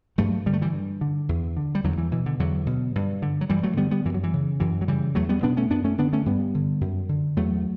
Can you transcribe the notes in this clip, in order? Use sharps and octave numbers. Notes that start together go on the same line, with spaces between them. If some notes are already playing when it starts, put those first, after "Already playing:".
G2 F#3 A3
D3 G3
A3
E3 G3
G2
D3
E2
D3
G3
E2 D3 F#3
E3
B2 E3
D3
E2 D3 F#3
B2
G2
D3
F#3
G2 E3 G3
F#3 A3
D3 G3 B3
G3 B3
F#2 E3
F#3
E3
C#3
F#2 E3
F#3
C#3 E3 G3
E2 F#3 A3
G3 B3
B2 B3 D4
A3 C#4
F#2 B3 D4
A3 C#4
D3 B3 D4
A3 C#4
G2 G3 B3
D3
F#2
D3
E2 F#3 A3